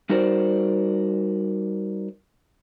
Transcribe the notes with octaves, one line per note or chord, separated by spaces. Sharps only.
G3 D#4 F#4 A#4 C5 D5